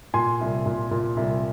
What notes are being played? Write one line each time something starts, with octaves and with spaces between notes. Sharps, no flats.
A#2 G#5 C6
C2
A#2
A#2
C2